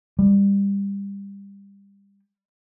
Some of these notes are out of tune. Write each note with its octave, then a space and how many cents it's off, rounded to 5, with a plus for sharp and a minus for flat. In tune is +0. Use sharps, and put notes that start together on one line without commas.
G3 +25